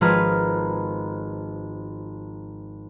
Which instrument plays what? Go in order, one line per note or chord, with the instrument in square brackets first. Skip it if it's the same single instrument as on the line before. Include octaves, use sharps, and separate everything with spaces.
[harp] G#1 F3 G#4 B4 A#5 F6